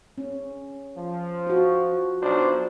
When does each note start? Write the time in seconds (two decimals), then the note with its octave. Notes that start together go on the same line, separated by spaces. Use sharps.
0.18 C#4
0.97 F3
1.47 F4 F#4
2.21 B1 D4 C5